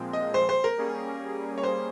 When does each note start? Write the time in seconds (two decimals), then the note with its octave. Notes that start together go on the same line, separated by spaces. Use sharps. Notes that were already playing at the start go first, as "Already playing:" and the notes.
Already playing: A#2 F3 G#3 C4
0.13 D#5
0.34 C5
0.49 C5
0.64 A#4
0.78 G3 A#3 C#4 G#4
1.58 C#5
1.63 C5